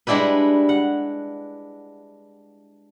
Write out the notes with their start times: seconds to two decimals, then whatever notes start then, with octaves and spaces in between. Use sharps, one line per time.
0.07 G3 G#3 D4 E4 G4 B4
0.69 F#5